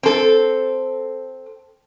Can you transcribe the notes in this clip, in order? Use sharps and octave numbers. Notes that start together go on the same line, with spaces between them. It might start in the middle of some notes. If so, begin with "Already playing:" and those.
C4 A4